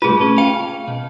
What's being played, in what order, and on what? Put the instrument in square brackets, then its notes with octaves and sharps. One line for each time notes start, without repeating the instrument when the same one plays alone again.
[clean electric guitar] C2 A2 B4 [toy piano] F4 G#4
[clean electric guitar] A3 C#4
[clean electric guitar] F5 [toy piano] G5
[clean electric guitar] B2